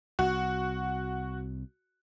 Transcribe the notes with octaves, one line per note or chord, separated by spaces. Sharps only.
C2 F#4